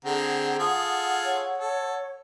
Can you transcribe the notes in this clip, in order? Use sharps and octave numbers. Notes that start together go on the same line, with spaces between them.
D3 C4 G#4 F#5 A#5
F4 G#4 A4 D#6
C#5
A4